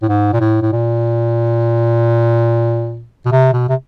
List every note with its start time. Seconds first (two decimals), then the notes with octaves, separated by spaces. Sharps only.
0.02 A2
0.09 G#2
0.33 A#2
0.40 A2
0.62 A2
0.72 A#2
3.26 B2
3.32 C3
3.53 B2
3.69 C3